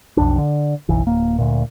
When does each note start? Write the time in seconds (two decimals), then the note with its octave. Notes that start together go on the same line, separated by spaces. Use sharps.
0.17 B1 F2 D4
0.38 D3
0.89 F#1 B1 E3
1.07 D1 A#3
1.38 D2 A#2